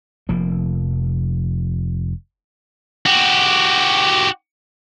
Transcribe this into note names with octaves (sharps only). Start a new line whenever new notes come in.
F1 F3 A#3
F#4 G4